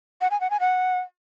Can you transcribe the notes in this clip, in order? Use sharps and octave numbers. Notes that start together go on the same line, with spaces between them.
F#5
G#5
F#5
G#5
F#5